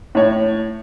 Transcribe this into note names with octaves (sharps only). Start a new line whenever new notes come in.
A2 C#5